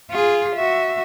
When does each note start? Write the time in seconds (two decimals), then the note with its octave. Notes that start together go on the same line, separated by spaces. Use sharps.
0.11 F4 G#4
0.55 F#4 E5